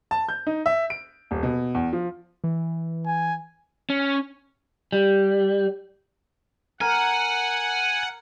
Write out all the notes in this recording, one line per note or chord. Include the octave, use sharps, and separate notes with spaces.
A5
G6
D#4
E5
D7
D#1
B2
E2
F3
E3
G#5
C#4
G3
A#4 F#5 G#5